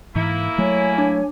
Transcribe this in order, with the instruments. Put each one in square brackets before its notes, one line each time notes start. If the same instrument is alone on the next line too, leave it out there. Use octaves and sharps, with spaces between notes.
[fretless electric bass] G#2 E3 [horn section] A#3 E4
[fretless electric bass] F#3 A3 [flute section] C#5 G#5
[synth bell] D4